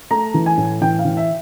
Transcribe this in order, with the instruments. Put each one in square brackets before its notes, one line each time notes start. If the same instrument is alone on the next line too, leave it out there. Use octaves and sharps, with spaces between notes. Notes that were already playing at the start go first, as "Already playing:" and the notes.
[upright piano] A3 A#5
E3
G#5
A2
E3 G5
F5
E3
E5